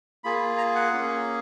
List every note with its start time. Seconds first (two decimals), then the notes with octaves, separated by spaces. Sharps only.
0.24 A#3 F4 G#4 B5
0.58 A#5
0.75 F#5
0.92 A#3 C#4 G#4